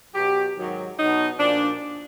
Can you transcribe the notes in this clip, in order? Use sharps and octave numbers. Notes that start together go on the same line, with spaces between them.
B2 F#3 G4
G#2 D#3 F#3
B2 F#3 D#4
A#2 F3 D4